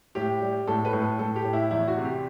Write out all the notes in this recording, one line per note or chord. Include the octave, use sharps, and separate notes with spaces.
A2 G4
G3
A2 A4
B4
A2
A4
A2 A4
G4
A2
E4
E2 E4
F#4
C3
G4